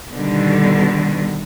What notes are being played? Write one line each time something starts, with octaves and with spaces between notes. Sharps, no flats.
B2 D3 D#3 G3